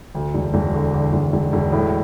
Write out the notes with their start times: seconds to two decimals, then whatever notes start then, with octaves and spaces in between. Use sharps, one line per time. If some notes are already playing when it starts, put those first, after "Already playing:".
0.15 D2
0.34 E1
0.54 E1
0.74 D3
0.94 D3
1.13 E1
1.33 E1
1.53 E1
1.72 A2